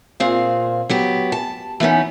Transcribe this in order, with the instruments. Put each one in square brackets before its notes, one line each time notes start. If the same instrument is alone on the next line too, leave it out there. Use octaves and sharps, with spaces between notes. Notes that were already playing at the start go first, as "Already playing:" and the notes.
[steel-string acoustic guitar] A#2 C4 G#4 F5
F#3 B3 G4
A5
E3 B3 C#4 D#4